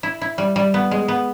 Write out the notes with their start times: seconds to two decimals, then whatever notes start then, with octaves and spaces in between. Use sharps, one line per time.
0.03 E4
0.21 E4
0.38 G3
0.56 G3
0.74 B3
0.91 G#3
1.08 B3